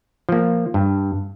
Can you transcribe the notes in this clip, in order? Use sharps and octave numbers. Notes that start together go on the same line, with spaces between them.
F3 A#3
G2